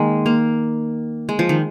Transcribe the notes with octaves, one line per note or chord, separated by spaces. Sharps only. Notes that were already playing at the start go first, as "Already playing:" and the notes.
Already playing: D#3 G#3 A#3
A#3
G#3
F3
D#3